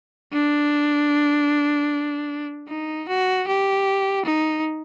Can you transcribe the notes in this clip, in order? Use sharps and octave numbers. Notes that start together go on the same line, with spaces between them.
D4
D#4
F#4
G4
D#4